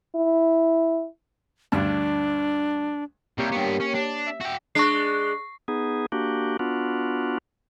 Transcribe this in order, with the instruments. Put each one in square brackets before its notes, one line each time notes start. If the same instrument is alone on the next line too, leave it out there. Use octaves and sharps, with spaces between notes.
[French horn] E4
[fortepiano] D2 G2 [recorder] D4
[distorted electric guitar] C3 G3 [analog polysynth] A#3 G4 C#5
[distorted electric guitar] G2 B3
C#4
D4
[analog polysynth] E5
[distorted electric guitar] F#4 G5
[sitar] G#3 D4 [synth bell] C#6 C7
[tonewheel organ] B3 D#4 G#4
A#3 D4 F#4 G4
B3 D4 F4 F#4